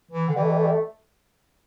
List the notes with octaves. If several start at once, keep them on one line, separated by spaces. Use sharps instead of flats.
E3
D3
E3 G3
A3
G3
A3
G3
A3